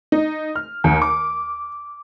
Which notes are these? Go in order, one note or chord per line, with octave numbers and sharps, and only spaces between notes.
D#4
F6
D#2
D6